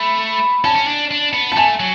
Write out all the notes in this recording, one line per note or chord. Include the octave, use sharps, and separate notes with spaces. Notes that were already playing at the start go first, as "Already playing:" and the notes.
Already playing: A3 B5
C#4 A5
C#4
D4
D4
B3
A5
A3 G#5
F#3